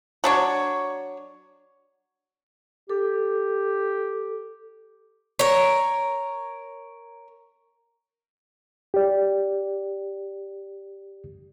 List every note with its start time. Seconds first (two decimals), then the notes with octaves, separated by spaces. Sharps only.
0.24 F#3 D4 C#5
2.90 G4 A4
5.39 A#4 C#5
8.94 G4 D5